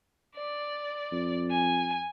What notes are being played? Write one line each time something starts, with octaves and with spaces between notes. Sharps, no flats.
D5
F2
G#5